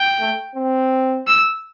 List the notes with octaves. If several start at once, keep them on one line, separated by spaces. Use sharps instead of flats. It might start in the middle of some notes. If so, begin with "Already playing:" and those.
Already playing: G5
A3
C4
E6